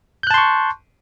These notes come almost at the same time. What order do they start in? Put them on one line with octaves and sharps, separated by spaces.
G6 F#6 A5 C6 C#6